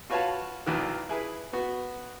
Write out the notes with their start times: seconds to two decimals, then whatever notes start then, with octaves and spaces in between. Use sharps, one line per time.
0.10 F4 F#4 B4 C#5 F5 A5
0.66 A#1 E2 B2 D#3
1.09 E4 G#4 B4
1.53 B3 F#4